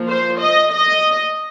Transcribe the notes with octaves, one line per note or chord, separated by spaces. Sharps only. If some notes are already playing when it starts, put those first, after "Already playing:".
Already playing: F3 A#3
C5
D#5
D#5